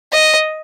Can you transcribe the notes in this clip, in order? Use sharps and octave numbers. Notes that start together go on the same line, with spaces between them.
D#5